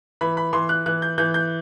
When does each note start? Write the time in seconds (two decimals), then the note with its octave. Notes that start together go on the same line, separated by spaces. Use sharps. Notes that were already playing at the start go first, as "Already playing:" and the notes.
0.21 E3 B5
0.37 B5
0.53 E3 C6
0.69 F#6
0.86 E3 F#6
1.02 G6
1.18 E3 G6
1.34 G6